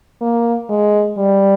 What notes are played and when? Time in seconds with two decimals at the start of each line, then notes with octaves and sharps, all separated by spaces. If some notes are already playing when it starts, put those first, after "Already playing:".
0.21 A#3
0.69 G#3
1.17 G3